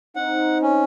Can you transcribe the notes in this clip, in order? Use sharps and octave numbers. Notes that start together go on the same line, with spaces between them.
C4 D#4 F#5
C#4